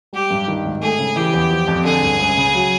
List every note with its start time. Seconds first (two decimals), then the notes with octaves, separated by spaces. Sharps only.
0.13 G3 G4
0.31 G2
0.48 D#3
0.65 G#1
0.82 A3 G#4
0.99 C#3
1.16 E3 G4
1.33 E2
1.51 F3
1.68 F2
1.85 D3 G#4
2.02 G1
2.19 C#2
2.37 C#3
2.54 F#3